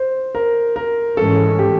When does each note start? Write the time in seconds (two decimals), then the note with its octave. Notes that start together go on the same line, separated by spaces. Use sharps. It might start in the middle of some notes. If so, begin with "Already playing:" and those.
Already playing: C5
0.35 A#4
0.76 A#4
1.17 G#2 E3 G#3 C#4 A4
1.59 G4